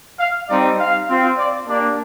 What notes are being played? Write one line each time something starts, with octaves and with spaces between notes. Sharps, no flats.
F5
G3 C4 D#4 D5
F5
C4 F4
D5
A#3 D4 G4 D5